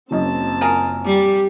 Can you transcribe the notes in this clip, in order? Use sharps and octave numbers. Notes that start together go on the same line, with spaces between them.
F#1 F#2 C4 D#5 A5
F4 G#4 A#4
G3 G4 D6